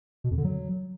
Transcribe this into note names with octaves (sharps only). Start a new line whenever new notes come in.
B2
F2
D3
F#3